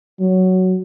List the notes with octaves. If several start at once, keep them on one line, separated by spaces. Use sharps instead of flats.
F#3